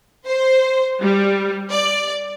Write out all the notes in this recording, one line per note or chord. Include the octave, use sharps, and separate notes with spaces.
C5
G3
D5